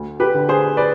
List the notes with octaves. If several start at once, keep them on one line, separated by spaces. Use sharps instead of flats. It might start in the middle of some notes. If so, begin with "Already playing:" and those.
Already playing: D2
G4 B4
D3
G#4 C5
B4 D5